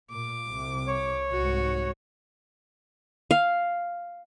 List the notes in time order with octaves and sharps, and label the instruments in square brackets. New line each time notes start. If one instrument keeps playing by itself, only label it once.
[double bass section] A#2 [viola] D6
[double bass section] C2 C3
[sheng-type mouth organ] C#5
[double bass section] C2 G#2 [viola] F#4
[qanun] F5